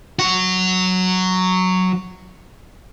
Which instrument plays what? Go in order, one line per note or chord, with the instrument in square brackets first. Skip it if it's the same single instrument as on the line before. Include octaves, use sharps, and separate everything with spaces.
[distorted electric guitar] F#3 F#4